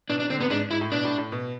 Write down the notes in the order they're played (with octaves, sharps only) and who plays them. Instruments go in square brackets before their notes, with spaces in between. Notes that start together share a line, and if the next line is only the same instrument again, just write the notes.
[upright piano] B2 [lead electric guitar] D4
[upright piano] C3 [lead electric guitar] D4
[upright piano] D3 [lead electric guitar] C4
[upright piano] C3 [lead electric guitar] B3
[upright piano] G#2 [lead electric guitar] D4
[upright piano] G#2 [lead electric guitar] E4
[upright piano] A2
[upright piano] B2 [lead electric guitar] D4
[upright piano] A2
A2
B2